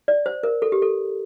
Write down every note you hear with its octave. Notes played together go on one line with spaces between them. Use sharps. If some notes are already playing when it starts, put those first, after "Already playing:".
D5
C5
A#4
A4
G4
A4